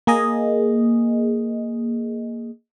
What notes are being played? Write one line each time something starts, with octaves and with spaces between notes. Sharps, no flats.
A#3 G#4 D#5